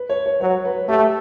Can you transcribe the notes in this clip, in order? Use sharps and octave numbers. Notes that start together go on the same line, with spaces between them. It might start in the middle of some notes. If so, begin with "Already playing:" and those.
Already playing: B4
C#5
C#5
F#3 C#5
B4
A3 G4